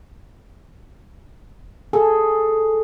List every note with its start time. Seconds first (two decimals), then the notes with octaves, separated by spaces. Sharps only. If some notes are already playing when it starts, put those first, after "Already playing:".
1.93 G#4 A4